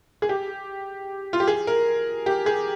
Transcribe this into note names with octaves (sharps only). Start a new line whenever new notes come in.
G#4
G4
F4
G4
G#4
A#4
G4
G#4